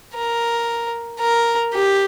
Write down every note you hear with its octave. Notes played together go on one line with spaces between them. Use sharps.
A#4
A#4
G4